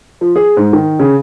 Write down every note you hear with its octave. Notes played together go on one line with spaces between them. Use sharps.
F3
G#4
G#2
D#3
C#3